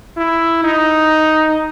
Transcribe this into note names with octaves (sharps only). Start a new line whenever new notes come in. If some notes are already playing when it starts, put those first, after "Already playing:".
E4
D#4